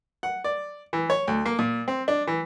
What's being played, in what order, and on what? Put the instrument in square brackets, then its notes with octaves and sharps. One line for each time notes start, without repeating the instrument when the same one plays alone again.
[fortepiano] F#5
D5
E3
C#5
D2
A#3
A#2
C4
D4
E3